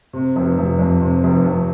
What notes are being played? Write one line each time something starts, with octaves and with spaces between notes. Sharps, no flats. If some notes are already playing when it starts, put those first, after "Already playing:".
C3
F1
F1
F2
C3
F1
F1